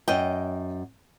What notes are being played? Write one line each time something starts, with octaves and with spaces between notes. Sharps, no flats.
F#2 D#5 G5